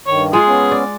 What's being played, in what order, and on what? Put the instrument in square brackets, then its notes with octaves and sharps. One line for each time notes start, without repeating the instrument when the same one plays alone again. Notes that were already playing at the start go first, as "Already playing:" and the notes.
[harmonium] G2 D#3 [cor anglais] C#5
[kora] G#3 F4 [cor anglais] G#4
[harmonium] B3 C#4
[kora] D5